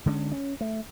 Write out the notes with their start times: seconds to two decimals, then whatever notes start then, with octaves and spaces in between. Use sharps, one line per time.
0.06 D3 G#3 A#3 C#4
0.32 C#4
0.61 A3